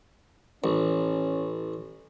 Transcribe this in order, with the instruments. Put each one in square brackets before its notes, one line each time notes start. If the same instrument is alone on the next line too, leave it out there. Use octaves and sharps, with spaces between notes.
[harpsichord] A1 [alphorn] C#4